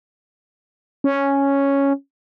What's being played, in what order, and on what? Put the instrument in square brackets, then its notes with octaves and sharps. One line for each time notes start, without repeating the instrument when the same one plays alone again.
[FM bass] C#4